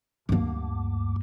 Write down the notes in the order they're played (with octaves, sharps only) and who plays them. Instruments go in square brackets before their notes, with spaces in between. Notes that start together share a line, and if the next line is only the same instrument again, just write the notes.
[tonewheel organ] D2 [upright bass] G2 A#3